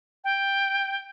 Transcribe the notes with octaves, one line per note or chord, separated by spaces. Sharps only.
G5